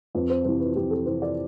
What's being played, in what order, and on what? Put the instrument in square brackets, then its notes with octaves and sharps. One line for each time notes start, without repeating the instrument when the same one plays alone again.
[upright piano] F2 B4
C5
C3 E3 C5
B4
F2 G4
A4
C3 E3 C5
D5